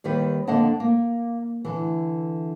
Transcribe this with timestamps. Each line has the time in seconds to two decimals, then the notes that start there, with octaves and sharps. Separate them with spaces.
0.04 D#2 D#3 G3 B4
0.47 F2 D3 A#3 D#5 F#5 A5
0.80 A#3
1.65 D3 E3